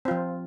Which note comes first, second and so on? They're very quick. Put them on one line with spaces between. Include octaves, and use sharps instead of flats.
C4 F4 F3